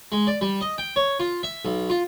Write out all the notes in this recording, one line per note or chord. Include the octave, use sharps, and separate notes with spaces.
G#3
D5
G3
D#5
G5
C#5
F4
E5
B1
F4